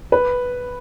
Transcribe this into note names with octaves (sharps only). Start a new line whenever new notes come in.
B4